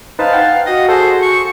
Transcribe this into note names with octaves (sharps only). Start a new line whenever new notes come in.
D#4 B4 C5 F5 A5
F#5 G5
F#4 D#5
G#4 A4 C5
C#6